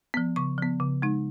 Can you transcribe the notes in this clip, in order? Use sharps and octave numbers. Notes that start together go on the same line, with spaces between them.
F3 B3
C#3 C#6
F3 B3
C#3
G#3 D#4